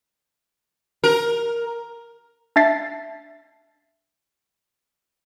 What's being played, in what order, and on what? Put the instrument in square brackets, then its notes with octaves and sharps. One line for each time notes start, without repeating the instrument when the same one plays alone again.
[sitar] A#4
[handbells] D4 E5 A6 C7